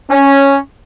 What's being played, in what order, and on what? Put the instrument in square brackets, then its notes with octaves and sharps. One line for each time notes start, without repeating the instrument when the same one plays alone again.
[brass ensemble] C#4